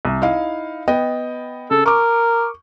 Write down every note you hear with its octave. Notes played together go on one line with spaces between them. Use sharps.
C2
D#4 E4 F5
B3 D#5 G5
C#3 A4
A#4 C#6 D6